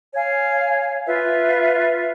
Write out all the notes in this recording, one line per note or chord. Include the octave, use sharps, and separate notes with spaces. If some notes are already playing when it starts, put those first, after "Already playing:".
C#5 F5 G#5
F4 B4 E5